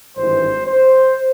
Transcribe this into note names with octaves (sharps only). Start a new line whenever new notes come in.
G#1 G2 E3 C5
C5